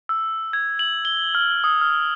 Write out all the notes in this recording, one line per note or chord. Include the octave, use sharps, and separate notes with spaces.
E6
G#6
F#7
G7
F6
D#6
F6